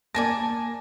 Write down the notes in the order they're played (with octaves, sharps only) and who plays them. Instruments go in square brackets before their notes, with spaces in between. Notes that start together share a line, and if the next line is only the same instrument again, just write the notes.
[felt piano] A#3 A#6 [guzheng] D5 G#5 A5